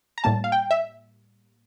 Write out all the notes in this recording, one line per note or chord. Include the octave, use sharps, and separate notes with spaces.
A#5
A2 G3 A#3 A5
F5
G5
E5